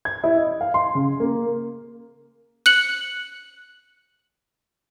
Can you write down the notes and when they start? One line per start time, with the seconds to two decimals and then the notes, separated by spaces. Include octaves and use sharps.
0.05 G#6
0.24 E4
0.36 D#5
0.61 F5
0.74 C6
0.95 C#3
1.20 A#3
2.66 F#6 C#7 F#7